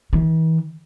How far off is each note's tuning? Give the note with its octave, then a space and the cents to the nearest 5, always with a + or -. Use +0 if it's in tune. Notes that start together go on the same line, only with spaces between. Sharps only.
E3 -40